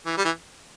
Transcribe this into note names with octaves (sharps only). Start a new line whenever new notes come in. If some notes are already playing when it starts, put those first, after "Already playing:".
E3
G3
E3